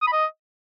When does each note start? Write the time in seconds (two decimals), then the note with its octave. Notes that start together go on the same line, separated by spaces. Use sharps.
0.02 D#6
0.07 B5
0.12 D#5